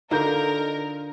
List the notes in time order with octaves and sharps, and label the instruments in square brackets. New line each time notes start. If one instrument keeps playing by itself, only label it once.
[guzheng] D3 [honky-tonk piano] D#4 A4 [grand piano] F4 A#5 G6 [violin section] A#4